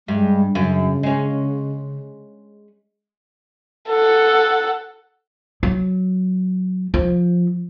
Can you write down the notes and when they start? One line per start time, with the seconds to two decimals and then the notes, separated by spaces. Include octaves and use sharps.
0.08 G2 G#3
0.55 F#2 C#3
1.03 G#3 C#4
3.90 A4 F#5
5.63 F#3
6.94 F3